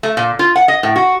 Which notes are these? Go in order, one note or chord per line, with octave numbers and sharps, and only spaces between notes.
A3
A#2
F4
F#5
D#5
A2
F#4